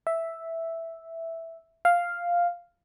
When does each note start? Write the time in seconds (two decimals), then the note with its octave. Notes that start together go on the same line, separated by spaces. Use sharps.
0.07 E5
1.85 F5